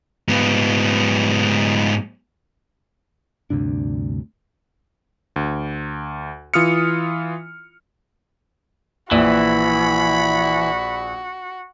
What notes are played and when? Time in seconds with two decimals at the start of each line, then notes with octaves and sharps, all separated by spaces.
0.28 G#2 B3
3.50 D2 G2 C3 D4
5.36 D2
6.54 E3 F4 D#6 F6 C#7
9.11 A#1 E3 F#4 B5